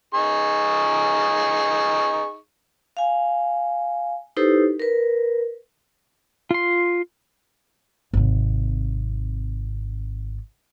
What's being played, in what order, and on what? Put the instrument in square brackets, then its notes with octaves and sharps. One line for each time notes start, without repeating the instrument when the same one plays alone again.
[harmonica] D#4 G#4 C#6
[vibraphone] F5 G#5
D#4 E4 G4 A4 B4 C5
A#4 B4
[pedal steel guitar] F4 C6
[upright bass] G#1 C3